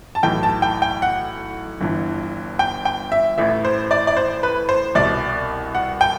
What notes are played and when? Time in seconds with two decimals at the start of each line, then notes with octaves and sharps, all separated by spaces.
0.15 A5
0.23 B1 A2 E3 G5
0.43 A5
0.62 G5
0.82 G5
1.02 F#5
1.81 G1 G2 E3
2.59 G5
2.85 G5
3.12 E5
3.38 A1 A2 E3 E5
3.65 C5
3.91 D5
4.07 D5
4.17 C5
4.43 B4
4.69 C5
4.95 C2 B2 D5
5.75 F#5
6.01 G5